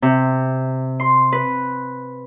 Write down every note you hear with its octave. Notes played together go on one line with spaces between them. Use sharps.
C3
C6
B4